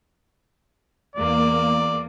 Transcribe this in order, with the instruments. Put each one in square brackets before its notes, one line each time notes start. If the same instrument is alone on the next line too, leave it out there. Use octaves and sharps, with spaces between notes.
[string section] E2 A#3 [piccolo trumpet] D5